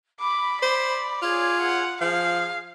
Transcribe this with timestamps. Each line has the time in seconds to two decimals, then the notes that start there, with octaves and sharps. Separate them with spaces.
0.20 B5 D6
0.62 C5 D5
1.22 F4 G#4 C#5
1.61 F#5
2.01 F3 G#4 F5